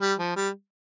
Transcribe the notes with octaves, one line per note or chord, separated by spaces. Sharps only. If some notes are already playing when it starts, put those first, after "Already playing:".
G3
F3
G3